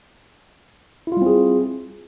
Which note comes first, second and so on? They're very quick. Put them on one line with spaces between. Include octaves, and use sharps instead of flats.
E4 F4 G3 C4 G#4